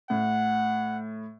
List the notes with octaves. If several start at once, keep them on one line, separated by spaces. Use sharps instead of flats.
A2 F#5